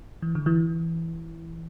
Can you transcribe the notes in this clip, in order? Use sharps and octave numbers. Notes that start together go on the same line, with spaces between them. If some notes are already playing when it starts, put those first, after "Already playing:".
E3
D3
E3